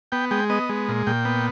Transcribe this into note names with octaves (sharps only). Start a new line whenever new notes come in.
B3 G5
G#3 G5
B3 D#5
G#3
A#2
A#2 G5
B3